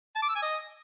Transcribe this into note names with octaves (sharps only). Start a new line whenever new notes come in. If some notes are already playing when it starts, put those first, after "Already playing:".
A5
D6
E6
G#5
D#5